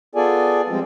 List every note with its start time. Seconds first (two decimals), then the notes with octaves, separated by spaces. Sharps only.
0.15 B3 F4 G#4 A4 D5 G#5
0.69 F3 G3 G#3 C4 F4